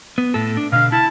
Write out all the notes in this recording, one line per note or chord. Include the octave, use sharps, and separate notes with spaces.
B3
A2 A4
D4
B2 D3 F5
E4 A5